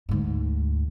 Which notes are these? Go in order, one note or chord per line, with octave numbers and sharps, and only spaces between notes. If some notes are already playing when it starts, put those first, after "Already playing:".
D2 G#2